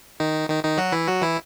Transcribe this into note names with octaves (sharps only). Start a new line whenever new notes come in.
D#3 D#4
D#3 D#4
D#3 D#4
F#3 F#4
E3 E4
F#3 F#4
E3 E4